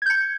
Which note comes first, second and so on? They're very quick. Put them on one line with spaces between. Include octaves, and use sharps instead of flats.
G#6 G6 C#7